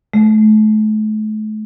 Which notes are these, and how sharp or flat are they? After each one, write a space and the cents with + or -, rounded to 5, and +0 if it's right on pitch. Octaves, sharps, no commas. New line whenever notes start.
A3 -40